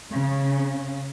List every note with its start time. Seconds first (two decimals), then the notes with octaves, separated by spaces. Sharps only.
0.11 C#3